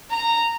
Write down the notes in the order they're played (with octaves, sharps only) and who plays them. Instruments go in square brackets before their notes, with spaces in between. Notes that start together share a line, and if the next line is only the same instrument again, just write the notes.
[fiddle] A#5